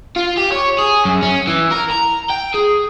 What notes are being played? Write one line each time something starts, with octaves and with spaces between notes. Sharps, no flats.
F4
G4
C#5
G#4
F#2
C#4
E3
A#4
A#5
G5
G#4